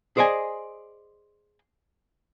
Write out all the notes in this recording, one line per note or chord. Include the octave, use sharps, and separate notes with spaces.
G#4 C5 D5 D#5 G#5